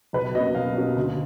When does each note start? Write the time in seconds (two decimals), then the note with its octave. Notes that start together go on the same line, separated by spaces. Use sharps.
0.13 B1 B4
0.35 B2 F#3 A#3 C#4 D#5
0.55 B1 F5
0.76 B2 F#3 A#3 C#4
0.96 D2